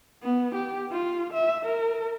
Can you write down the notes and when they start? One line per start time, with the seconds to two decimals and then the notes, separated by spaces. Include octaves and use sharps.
0.23 B3
0.55 G4
0.91 F4
1.33 E5
1.65 A#4